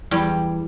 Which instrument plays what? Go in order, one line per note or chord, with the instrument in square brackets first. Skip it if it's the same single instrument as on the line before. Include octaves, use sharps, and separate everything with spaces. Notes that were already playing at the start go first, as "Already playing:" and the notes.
[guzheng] E2 G3